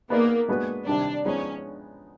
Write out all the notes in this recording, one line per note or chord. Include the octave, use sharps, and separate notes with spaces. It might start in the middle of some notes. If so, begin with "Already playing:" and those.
A#3 B3 D#4 G#4 B4 D5
G#3 B3 D4 F#4 B4
C3 D#3 G3 D4
F3 G#3 B3 C#4 D#4 G#4